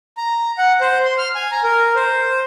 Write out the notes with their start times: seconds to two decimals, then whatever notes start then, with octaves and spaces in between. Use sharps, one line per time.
0.17 A#5
0.58 F#5
0.81 C5
1.05 C6
1.18 F6
1.35 G#5
1.52 A#5
1.64 A#4
1.96 C5